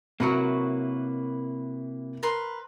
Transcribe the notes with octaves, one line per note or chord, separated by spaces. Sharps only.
C3 F#3 A#3 E4 F#4 A#4 B4
A#4 B4 C6